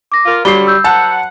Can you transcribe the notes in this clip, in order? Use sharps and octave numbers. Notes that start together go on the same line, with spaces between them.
D6 A#6
F4 A#4
D3 F#3 G3 G4 C7 G7
E6 G6
F#3 B4 F#5 A5